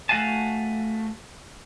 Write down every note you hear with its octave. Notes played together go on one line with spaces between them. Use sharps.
A3 F#4 F5 G#5 A5